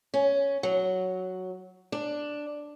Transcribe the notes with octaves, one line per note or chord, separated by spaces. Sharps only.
C#4
F#3
D4